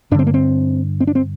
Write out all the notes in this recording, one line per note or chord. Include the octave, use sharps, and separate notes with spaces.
G2 D3 C4 D4
A#3
C4
C4
D4
C4